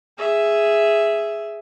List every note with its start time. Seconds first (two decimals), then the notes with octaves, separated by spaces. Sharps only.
0.18 G#4 E5